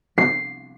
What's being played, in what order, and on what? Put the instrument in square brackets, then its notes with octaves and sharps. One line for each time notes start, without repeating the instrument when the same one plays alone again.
[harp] C7